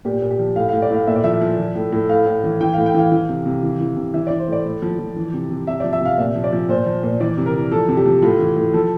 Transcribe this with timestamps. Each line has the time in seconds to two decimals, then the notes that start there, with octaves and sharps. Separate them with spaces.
0.05 A#2 G4
0.22 A#2
0.31 G4
0.39 F3
0.56 A2 F5
0.69 A2 F5
0.82 D5
0.90 A2 F5
1.07 A#2 E5
1.16 D5
1.24 F3 E5
1.41 F3
1.58 F3
1.75 A2
1.92 A2
2.09 A2 F5
2.26 A2
2.44 E3
2.61 E3 G5
2.73 A2 F5
2.86 G5
2.95 E3 F5
3.12 E3
3.29 C3
3.46 C3
3.63 E3
3.80 E3
3.97 C3
4.14 E3 E5
4.27 E3 D5
4.39 C5
4.48 A2 D5
4.65 A2
4.82 F3
4.99 F3
5.16 E3
5.34 C3
5.50 C3
5.67 C3 E5
5.80 F3 D5
5.93 E5
6.01 C3 F5
6.18 A#2 E5
6.35 F3
6.44 D5
6.53 F3
6.69 A#2 C5
6.86 F3
7.03 A#2
7.20 E3 D5
7.38 C3
7.46 A#4
7.55 E3
7.72 F3 A4
7.89 C3
7.97 G4
8.06 F3
8.22 A2 F4
8.40 E3
8.57 A2
8.74 F3 A4